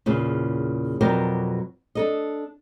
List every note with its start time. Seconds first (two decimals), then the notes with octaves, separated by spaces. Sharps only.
0.06 E2 A#2 C#3
1.01 F2 B2 F#3 A#4 D5 G5
1.95 D4 A4 D#5